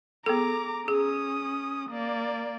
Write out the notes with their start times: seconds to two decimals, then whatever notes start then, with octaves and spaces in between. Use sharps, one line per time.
0.26 B3 G#4 A4 A#5 D6
0.88 C#4 G#4 D#6
1.89 A#3 D5